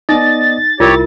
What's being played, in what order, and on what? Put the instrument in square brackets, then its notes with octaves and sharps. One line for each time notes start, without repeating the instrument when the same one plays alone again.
[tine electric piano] B3 D5 D#5 [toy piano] D#4 [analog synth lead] A6
[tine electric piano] C2 E4 [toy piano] F4 A#4 [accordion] G4 C#5